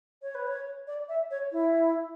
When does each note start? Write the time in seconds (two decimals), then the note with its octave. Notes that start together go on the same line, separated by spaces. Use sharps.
0.22 C#5
0.35 B4
0.47 C#5
0.87 D5
1.08 E5
1.30 C#5
1.52 E4